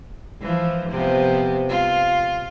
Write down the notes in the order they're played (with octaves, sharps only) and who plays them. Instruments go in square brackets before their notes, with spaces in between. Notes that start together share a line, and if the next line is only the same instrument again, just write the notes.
[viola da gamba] E3 F3
C3 F3 B3
F4